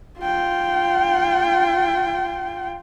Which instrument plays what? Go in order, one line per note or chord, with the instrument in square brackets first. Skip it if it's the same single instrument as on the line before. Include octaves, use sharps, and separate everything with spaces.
[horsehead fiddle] F4 G5